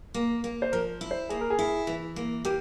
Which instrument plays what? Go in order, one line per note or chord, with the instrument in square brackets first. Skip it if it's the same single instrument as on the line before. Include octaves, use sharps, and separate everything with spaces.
[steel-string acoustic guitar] A#3
A#3
[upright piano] C5
[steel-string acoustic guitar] F3 [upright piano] A#4
[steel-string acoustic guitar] E4
[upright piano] C5
[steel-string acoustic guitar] A#3 [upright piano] G#4
[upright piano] A#4
G#4
[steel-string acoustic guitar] E4
E3
A#3
[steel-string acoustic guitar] A#3 [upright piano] G4